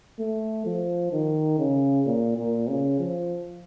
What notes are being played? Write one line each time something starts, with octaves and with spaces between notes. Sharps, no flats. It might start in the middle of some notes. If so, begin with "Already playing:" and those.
A3
F3
D#3
C#3
A#2
A#2
C#3
F3